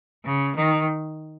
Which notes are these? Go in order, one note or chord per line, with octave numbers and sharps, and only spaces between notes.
C#3
D#3